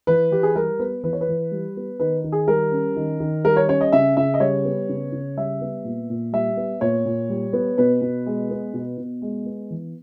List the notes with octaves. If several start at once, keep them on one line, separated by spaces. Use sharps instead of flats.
E3 B4
E3 G4
G#4
G3 A#4
B3 B4
E3 B4
C#5
B4
E3
G3
B3
D#3 B4
D#3
G#4
G3 A#4
C#4
D#3
D#3
G3 A#4
C#5
C#4 C#5
D#5
C#3 E5
C#3 E5
D#5
G3 C#5
B3
C#3
C#3
G3 E5
B3
A#2
A#2
G3 E5
B3
A#2 C#5
A#2
G3
B3
B2 B4
B2
G#3
B3
B2
B2
G#3
B3
E3